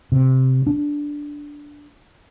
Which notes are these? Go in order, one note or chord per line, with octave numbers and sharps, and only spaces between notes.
C3
D4